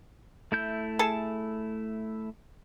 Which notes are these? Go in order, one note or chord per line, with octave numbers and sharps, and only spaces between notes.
A3 E4 G6
G#4 A4 A5